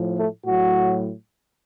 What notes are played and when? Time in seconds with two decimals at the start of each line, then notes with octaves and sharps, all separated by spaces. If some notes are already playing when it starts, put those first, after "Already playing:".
Already playing: A2 F3
0.18 A3
0.45 A2 F#3 F#4